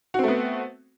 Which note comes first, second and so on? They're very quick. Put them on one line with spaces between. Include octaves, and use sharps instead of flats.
F#4 C4 A3 B3